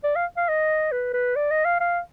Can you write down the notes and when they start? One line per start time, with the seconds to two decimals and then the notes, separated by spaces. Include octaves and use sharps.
0.04 D5
0.16 F5
0.37 F5
0.49 D#5
0.92 B4
1.14 B4
1.36 D5
1.51 D#5
1.65 F5
1.80 F5